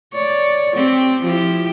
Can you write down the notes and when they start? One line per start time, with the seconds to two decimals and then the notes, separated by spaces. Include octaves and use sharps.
0.14 C#5 D5
0.75 C4 G4
1.23 F3 E4 G4